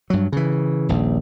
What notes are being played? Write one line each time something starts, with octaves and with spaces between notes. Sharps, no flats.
G2 F#3
C#3 E3
D#1 A#1